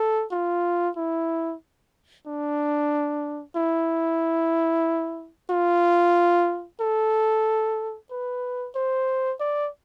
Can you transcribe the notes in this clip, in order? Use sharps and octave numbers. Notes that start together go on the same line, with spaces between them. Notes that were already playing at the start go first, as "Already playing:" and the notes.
Already playing: A4
F4
E4
D4
E4
F4
A4
B4
C5
D5